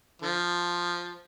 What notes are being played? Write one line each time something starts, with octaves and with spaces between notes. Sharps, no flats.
D3 F3